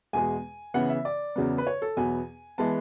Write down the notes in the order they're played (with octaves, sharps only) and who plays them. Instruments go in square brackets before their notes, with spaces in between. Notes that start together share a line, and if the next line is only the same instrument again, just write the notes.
[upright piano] E2 B2 G#3 G#5
C#3 E3 B3 F#5
E5
D5
E2 C#3 F#3 B3
B4
C#5
A4
E2 B2 F#3 B3 G#5
E3 G#3 B3 A5